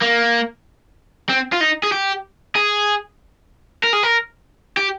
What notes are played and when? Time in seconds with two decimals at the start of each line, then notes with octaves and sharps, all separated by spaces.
0.01 A#3
1.29 C4
1.53 F4
1.60 D#4
1.83 G#4
1.92 G4
2.56 G#4
3.83 A#4
3.93 G#4
4.03 A#4
4.77 G4